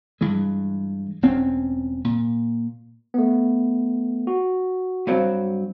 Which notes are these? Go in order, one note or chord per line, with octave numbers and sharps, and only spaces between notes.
G2 E3 G#3
E1 C4 C#4
A#2
A3 B3
F#4
G2 F#3 C4